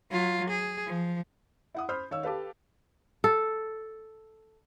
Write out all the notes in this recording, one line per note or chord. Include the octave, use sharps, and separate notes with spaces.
F#3 F4
G#4
F3
E4 F#5 D#6
C5 B5 D#6 F6 G6
D#3 C#5 F5 E6
G4 A4 B4 F5
A4